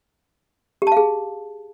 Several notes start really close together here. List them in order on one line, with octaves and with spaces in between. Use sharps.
G4 A5 F5 G#4